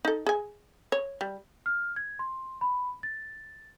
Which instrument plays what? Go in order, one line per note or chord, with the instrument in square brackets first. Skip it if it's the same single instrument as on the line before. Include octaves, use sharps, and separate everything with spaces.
[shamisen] D#4 A4
G#4 G#5
C#5
G3
[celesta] F6
G#6
C6
B5
A6